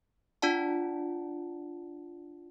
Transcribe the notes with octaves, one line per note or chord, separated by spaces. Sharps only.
D4 F4 D5 F#5 A5